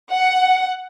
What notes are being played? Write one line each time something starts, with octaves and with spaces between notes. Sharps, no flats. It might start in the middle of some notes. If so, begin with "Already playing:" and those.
F#5